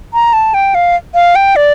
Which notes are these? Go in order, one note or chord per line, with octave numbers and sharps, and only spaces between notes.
A#5
A5
G5
F5
F5
G5
D5